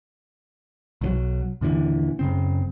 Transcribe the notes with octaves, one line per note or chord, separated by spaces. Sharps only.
B1 D#3 F#3
D#2 A#2 D3 E3
F#1 C#3 C4